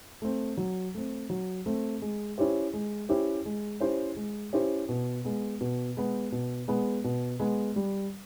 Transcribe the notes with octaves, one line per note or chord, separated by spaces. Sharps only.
A3 C4
F#3
A3 C4
F#3
A3 C4
G#3
C#4 E4 G4 C5
G#3
C#4 E4 G4 C5
G#3
C#4 E4 G4 C5
G#3
C#4 E4 G4 C5
B2
G#3 B3
B2
G#3 B3
B2
G#3 B3
B2
G#3 B3
G3